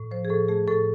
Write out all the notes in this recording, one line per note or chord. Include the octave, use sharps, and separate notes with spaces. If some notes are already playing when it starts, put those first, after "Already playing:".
Already playing: A2
F3 C5
G#4
A2 A4
A3 G#4
A2 A4